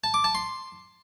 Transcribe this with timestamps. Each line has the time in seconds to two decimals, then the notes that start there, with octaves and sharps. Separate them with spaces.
0.04 A5
0.14 D6
0.24 A5
0.35 C6